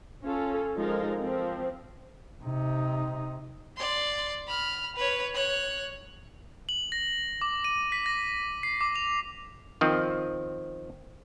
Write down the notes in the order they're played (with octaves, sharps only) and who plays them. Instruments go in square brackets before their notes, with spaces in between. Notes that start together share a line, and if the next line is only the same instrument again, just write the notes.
[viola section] C#4 F4 A4
F3 G#3 D#4 F4 A4 A#4
F3 C4
[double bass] C3 D#4
[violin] D5 C6
B5 F6
B4 C#5
C#5 F#6
[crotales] F#7
A#6
D6
D#7
B6
A#6
C7
D6
F7
[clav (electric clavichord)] D#3 F3 C4